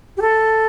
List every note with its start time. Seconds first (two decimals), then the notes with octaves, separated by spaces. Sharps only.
0.17 G4
0.21 A4